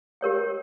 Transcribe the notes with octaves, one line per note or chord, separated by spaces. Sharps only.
G4 A#4 C#5 G5